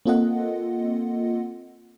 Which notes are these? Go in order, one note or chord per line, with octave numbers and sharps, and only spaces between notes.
A#3 C4 F4 A4 D#5 F#5